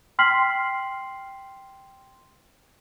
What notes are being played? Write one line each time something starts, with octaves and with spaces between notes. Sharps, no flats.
G5 C6 F6 B6 C7 F#7